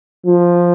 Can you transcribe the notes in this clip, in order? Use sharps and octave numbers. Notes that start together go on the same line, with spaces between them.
F3